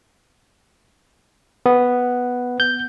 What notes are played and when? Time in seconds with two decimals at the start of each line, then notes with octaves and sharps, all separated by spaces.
1.66 B3
2.60 G6